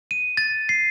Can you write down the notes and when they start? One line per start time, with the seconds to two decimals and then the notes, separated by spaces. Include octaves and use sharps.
0.11 D#7
0.37 A6
0.69 C7